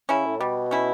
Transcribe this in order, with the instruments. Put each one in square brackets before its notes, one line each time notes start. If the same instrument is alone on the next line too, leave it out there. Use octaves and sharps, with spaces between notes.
[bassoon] C#3 [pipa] C#4 E4
[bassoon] A2
[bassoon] B2 [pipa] G3
[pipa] C#4 E4